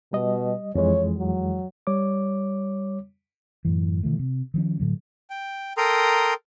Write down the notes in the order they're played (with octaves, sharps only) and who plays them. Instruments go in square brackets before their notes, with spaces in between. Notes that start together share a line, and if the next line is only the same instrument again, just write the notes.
[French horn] B2 [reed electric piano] G3 D#5
[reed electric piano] F2 E3 G#3 [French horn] C#5
[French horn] F#3
[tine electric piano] G3 C#5 D6
[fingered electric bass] F#2 A2 E3
B2 D#3 E3 A3
C3
D#3 F3 C#4
A2 D3 F#3
[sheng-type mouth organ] G5
A4 A#4 G5 A#5 C6 D#6